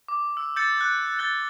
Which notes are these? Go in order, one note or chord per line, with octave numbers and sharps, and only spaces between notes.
D6
E6
E6 G6 A6 C#7
F#6
F#6 A6 G7